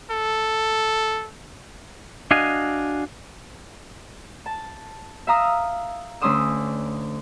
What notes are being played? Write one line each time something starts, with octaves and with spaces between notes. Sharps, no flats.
A4
D4 F#4 D#5 F5 G#5
A5
E5 F5 A#5 D#6 E6
D2 C#4 D4 C6 D#6 E6